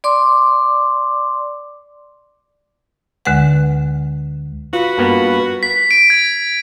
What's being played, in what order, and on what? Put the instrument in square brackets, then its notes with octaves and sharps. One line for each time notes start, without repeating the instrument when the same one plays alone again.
[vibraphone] D5 C6 D6
[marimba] D2 D3 G#3 B4 F#5
[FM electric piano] F4 [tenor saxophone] F#4 [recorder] B4
[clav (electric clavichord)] G2 A#3 B3
[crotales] B6
D7
G#6